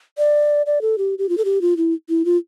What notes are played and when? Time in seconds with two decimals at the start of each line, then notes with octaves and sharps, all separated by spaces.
0.18 D5
0.66 D5
0.82 A4
0.98 G4
1.19 G4
1.29 F4
1.38 A4
1.45 G4
1.61 F4
1.77 E4
2.09 E4
2.25 F4